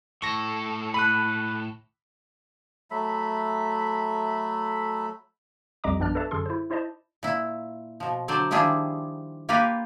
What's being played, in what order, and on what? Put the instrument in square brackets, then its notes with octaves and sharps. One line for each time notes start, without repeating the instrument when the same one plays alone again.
[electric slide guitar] A2 A4 [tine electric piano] C#6 A#6
[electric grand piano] B5 [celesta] F#6 D#7 F#7
[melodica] F#3 A3 E5 B5
[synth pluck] C2 F2 G3 D#5 A#5 D6
A#1 F#2 B3 D4 D5 F6
A4 B4 C#5 D5 E5 A5
F#2 D3 G#4 A4 C6
E4 C5
D#4 E4 C5 D5 D#5 A5
[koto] A#2 E4
B2 F3
D3 F#3 C5 D5
D#3 F3 G3 D4 E4 G#4
A#3 F4 G4 A#4 B4